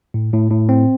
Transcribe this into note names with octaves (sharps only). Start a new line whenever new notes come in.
A2
A2
A2
C4